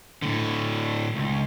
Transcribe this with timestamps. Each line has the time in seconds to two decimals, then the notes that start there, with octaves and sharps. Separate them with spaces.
0.22 A2 D3
1.16 C#2